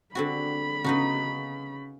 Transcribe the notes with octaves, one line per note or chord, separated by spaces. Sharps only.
D3 C4 F#4 B5
C#3 B3 D#4 F#4